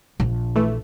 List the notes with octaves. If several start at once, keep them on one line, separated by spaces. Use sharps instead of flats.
A#1
E3 A3